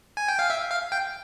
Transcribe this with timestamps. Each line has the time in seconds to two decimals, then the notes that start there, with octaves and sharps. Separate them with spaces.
0.17 G#5
0.28 G5
0.39 F5
0.50 E5
0.71 F5
0.92 G5